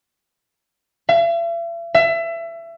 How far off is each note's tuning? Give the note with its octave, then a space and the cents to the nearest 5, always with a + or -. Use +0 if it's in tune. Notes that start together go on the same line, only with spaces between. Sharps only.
E5 +45
E5 +25